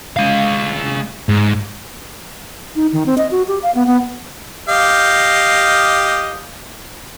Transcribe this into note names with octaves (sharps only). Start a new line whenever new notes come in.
G#3 F5
G#2
D#4
D#3
C4
D#5
F#4
G4
F5
B3
B3
G4 D#5 F5